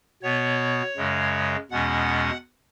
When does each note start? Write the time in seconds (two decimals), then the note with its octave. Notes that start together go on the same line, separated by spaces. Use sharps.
0.23 B2 B3 C#5
0.97 F#2 C#3 G#3
1.71 E2 B2 G#3 C#4 F#5